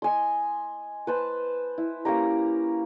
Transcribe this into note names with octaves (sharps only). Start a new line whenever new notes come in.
D#5 G#5 C6
B4 C5 A5
E4
A#3 C#4 G4 A#5